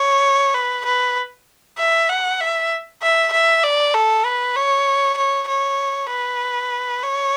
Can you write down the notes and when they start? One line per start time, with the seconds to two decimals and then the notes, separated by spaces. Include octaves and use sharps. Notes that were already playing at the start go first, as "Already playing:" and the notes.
Already playing: C#5
0.54 B4
0.86 B4
1.78 E5
2.09 F#5
2.41 E5
3.02 E5
3.33 E5
3.63 D5
3.94 A4
4.25 B4
4.56 C#5
5.17 C#5
5.48 C#5
6.10 B4
7.03 C#5